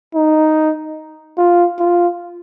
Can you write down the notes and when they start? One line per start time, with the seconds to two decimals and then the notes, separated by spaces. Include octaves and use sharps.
0.15 D#4
1.38 F4
1.79 F4